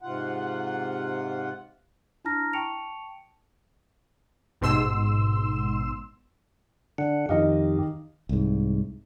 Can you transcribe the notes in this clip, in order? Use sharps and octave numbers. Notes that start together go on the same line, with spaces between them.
G#2 C3 F4 F#5
D4 E4 A5 A#5 F6 A#6
G5 A5 C#6 C#7 D7 F7
A1 G#2 B2 C6 E6 E7
D3 D4 F#5
F2 D#3 G4 D#5 F5
C2 G#2